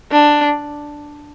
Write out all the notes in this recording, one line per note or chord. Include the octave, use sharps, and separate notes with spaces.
D4